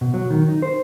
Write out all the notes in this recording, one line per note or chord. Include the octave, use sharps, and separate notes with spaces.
B2
F#3
D#3
D#4
C5